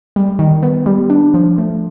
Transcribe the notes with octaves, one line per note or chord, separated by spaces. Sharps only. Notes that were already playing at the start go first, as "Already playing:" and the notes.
G3
D#3
B3
G3
D4
F3
A3